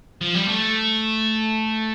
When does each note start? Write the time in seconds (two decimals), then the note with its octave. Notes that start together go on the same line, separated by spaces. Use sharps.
0.21 F3
0.34 G3
0.48 A3